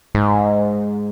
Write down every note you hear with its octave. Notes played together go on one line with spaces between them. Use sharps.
G#2